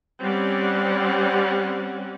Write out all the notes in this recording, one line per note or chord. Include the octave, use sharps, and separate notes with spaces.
G3 C4 C#4 D5 F#5